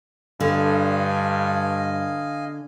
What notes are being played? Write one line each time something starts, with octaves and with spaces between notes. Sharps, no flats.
G2 D3 D#5 F5 G#5